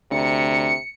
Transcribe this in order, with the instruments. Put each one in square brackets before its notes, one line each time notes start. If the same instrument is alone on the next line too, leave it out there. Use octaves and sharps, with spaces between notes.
[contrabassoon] D2 [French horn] C3 [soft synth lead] C#7